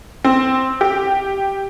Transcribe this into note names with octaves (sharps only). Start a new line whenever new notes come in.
C4
G4